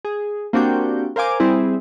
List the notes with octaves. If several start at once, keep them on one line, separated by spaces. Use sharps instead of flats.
G#4
A#3 C4 D4 F#4 G4 G6
A#4 C5 F5 G#5 D6
G3 C4 E4 G#4